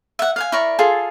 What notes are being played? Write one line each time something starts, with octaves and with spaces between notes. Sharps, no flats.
E5 F#5
F5 F#5 G#5
E4 A#4 D5 C#6
F4 G#4 A4